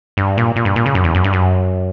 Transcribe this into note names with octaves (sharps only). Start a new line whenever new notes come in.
G2
A#2
A#2
G2
A#2
C#3
F#2
E2
F#2
G2
F#2